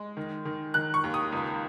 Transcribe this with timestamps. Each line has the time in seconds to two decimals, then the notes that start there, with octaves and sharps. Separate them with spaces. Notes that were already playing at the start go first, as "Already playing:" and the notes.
Already playing: G#3
0.17 D#3
0.45 D#3
0.74 D#3 F#6
0.94 C#6
1.04 D#2
1.14 D#6
1.32 C#2